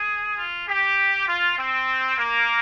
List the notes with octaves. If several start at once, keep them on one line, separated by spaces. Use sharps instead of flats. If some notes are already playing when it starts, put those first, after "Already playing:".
Already playing: G#4
F4
G4
F4
C4
A#3